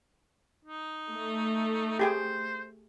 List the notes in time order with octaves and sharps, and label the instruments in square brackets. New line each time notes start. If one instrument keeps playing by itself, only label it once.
[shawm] D#4
[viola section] A3
[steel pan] G4 G#4 G5 [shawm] C5